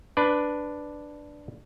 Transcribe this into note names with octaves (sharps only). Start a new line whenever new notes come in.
D4 B4 D5